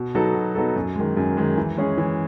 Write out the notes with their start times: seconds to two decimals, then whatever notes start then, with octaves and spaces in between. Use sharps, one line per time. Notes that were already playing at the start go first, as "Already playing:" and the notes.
Already playing: B2
0.15 F#3 B3 D#4 A4
0.35 B2
0.55 F#3 B3 D#4 A4
0.76 F#2
0.96 D#3 G#3
1.17 F#2
1.37 D#3 G#3
1.58 E3
1.77 G#3 C#4 G#4
1.98 E3